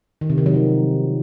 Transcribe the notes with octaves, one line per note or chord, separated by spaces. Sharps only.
D#3
C3
D#3
F#3
F3